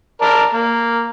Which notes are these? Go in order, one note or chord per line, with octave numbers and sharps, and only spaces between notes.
A#4 D5 A5
A#3